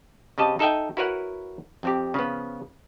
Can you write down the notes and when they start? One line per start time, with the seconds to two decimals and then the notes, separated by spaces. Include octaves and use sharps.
0.38 C#3 C4 G4 D#5 A5
0.59 D#4 A4 D#5 E5 G5
0.97 E4 F#4 A#4 B4 C#5 F#5
1.83 F2 C4 G4
2.14 C#3 F3 B3